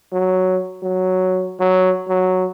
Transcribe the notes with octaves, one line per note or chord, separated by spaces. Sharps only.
F#3
F#3
F#3
F#3